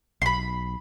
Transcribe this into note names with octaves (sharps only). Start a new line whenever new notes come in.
B1 B5 C6